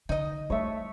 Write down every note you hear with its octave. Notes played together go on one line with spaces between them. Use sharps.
D3 D#4 D#5
G3 A3 C#5 E5